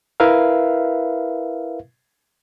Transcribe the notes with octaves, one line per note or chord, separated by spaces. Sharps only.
E4 A#4 B4 E5 F5